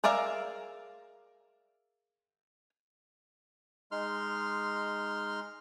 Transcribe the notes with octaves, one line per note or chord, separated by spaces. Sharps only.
G#4 A#4 D5 E5 F5
G#3 D#4 C6 F6